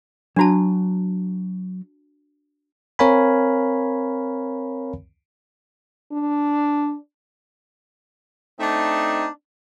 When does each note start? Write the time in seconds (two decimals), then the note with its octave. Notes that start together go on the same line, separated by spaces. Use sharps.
0.36 F#3 D4 F#4 A5 A#5
2.99 C4 A#4 C#5 F5 G#5 B5
6.12 D4
8.60 A3 C4 D4 D#4